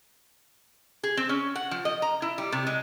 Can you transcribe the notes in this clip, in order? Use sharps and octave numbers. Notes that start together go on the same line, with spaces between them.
G#4
C4
C#4
F#5
F3
D#5
A#5
E4
G3
C3
G#3